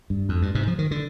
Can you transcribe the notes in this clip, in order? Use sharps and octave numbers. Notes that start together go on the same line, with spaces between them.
G2
F2
G2
G#2 C3
F3
D#3
D3